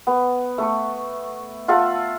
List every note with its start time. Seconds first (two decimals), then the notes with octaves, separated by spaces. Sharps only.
0.07 B3
0.58 A3 C#6
1.68 F4 A4 E5 F#5